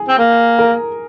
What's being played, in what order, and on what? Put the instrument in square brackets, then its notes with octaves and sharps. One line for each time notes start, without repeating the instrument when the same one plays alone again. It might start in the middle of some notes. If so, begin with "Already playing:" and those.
Already playing: [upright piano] G#4
[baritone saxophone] C4
A#3
[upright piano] A#4